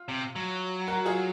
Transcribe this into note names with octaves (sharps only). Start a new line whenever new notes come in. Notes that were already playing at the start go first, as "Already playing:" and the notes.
Already playing: F4
C3
F#3
F#4 A#4
F4 G#4